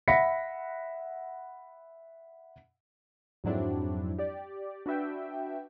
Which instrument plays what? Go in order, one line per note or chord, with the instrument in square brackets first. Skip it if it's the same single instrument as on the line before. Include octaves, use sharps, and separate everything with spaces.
[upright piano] E5 F#5 B5 A#6 B6 C#7
[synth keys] F2 G#2 F#3 C4 D4 E4
G4 D5
D4 F#4 B4 E5 G5